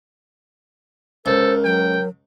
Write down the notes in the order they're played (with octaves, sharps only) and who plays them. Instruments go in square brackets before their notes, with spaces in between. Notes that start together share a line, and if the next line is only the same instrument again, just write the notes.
[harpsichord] C#2 [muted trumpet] A4 [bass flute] A#4 [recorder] C5
[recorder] F#3 [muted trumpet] G5